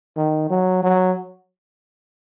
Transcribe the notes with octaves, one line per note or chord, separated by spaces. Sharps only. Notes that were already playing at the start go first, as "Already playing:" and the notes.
D#3
F#3
F#3